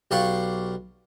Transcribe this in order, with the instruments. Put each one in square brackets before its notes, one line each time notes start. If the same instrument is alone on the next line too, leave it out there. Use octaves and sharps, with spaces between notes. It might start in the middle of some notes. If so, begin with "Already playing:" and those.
[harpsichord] B1 G4 D5 F5 F#5 C#6